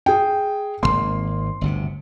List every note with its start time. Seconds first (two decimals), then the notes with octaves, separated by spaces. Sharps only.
0.06 G#4 G5
0.83 G#1 F#2 A#3 C6
1.61 G1 D2 C3